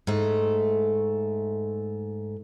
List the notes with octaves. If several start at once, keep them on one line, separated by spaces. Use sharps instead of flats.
G#2 A3